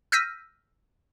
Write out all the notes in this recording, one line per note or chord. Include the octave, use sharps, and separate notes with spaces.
E6 F6 G6 A#6 B6 D#7